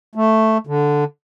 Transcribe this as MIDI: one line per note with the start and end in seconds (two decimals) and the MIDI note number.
0.15 0.58 57
0.67 1.04 50